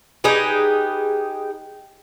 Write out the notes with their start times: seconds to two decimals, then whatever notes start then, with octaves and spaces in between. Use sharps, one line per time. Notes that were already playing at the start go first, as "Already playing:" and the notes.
0.24 D#4 G4 G#4 B4